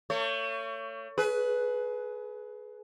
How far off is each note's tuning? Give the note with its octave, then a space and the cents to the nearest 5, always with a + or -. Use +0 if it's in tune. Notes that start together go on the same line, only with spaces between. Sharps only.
A3 +40 C#5 +15
G#4 +30 B4 +0